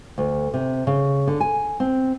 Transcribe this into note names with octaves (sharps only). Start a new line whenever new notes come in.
D2
C3
C#3
D3
G#5
C4